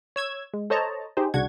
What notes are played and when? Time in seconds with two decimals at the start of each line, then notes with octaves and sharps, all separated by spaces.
0.16 C#5 E6 G#6
0.54 G#3
0.70 A4 C5 C#5 D#5 A5 A#5
1.17 D#4 G4 G#4 C5
1.34 C2 C#3 D4 F#4 F#5 G#6